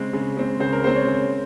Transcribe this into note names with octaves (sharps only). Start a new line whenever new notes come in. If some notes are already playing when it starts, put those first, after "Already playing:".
Already playing: C#3 G#3 C4
C#3
G#3 C4
C#3 C5
A#4
G#3 C4 C5
C#5
C#3